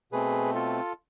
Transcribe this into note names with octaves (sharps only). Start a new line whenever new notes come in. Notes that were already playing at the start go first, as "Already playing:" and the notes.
B2 A3 C4 G#4 B4
F4 A4